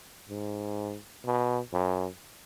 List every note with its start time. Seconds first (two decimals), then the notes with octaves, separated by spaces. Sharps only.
0.30 G#2
1.25 B2
1.73 F#2